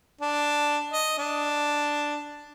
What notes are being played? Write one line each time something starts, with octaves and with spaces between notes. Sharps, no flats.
D4
D#5
D4